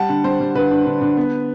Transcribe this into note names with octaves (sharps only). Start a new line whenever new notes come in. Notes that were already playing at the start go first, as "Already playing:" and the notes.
Already playing: G3 F#5 A5
D3
G3 C5
G3
D3 B4
D4
D3
D3
B3